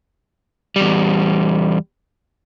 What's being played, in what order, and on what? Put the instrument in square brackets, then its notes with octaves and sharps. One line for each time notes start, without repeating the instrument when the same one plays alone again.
[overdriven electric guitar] E2 G3